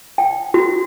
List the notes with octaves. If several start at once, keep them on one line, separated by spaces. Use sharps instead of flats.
G5
F#4